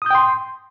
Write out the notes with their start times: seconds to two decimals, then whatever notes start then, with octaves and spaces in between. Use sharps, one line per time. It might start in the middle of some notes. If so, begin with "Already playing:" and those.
0.02 D#6
0.06 G6
0.10 G5
0.15 C6